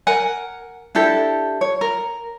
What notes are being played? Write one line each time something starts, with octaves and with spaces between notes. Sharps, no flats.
A#4 F#5 G#5
D4 E4 G4 A4
C#5
A#4